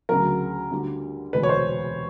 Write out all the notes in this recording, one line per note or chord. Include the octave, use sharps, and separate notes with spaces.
D2 C#3 F#3 A#4
D2 D3 G3
E1 D2 C3 B4
C#5
C5